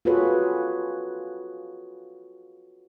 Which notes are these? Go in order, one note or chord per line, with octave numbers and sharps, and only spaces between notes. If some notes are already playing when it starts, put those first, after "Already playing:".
F4 F#4 G#4 A4 B4 C#5